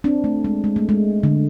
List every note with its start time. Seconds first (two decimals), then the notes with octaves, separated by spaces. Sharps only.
0.04 C4 D4
0.24 A3
0.44 G#3
0.64 G#3
0.76 A3
0.89 G#3
1.23 D3